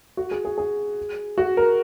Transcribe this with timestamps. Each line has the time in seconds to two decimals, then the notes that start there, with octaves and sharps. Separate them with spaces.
0.17 F#4
0.31 G#4
0.45 G#4
0.58 G#4
1.38 F#4
1.57 A#4